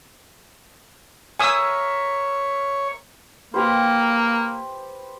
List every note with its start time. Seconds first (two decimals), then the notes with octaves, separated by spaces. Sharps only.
1.39 A#4 C#5 E5 G#5 D#6 E6
3.54 A#3 G4 B4 C5